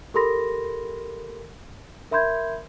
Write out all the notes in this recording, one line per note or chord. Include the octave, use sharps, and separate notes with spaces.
G4 A4 A#4 B5 C6 A#6
A#4 E5 B5 C6 G6 G#6